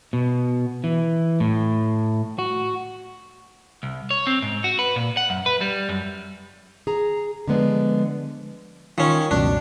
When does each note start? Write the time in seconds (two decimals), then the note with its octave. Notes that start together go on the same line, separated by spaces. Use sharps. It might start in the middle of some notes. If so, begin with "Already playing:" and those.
0.13 B2
0.84 E3
1.40 A2
2.39 F#4
3.83 C2
4.11 C#5
4.27 C4
4.42 G#2
4.64 F#4
4.79 B4
4.96 A#2
5.17 F#5
5.30 F#2
5.46 B4
5.61 G3
5.89 F#2
6.87 G#4 A#5
7.48 D3 F3 G#3 B3 D5
8.98 D#3 C#4 F4 C#6
9.31 C#2 F#2 B2 D4